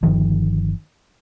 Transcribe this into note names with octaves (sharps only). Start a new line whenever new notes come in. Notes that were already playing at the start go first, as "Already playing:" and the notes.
G1 D#3 F3